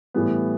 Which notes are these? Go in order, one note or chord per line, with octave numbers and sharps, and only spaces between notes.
A2 E3 G3 B3